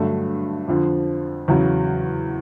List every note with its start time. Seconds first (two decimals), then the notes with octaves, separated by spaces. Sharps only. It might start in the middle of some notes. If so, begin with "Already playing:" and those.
Already playing: G2 D3 F#3 A3
0.68 F2 D3 F3
1.48 E2 C#3 F#3